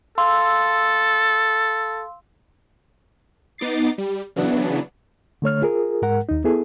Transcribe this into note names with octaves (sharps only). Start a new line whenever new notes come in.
A4 F5 C6 E6
B3 D#4 D6 A6 C7
G3
C#3 E3 F#3 B3 D4
D3 A3 C#5 F6
F4 G#4 A#4
G#2 G#3 A#4 F#5
D#2 D#4
B3 E4 G#4 A4